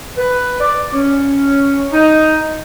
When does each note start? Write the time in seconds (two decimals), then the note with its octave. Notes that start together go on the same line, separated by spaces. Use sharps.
0.17 B4
0.60 D5
0.93 C#4
1.92 D#4